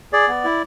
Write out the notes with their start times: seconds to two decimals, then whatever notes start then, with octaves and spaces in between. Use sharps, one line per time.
0.13 G#4 D5
0.28 B3
0.44 E4